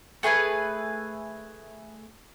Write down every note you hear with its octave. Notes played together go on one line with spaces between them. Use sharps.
A3 G#4 B4 G#5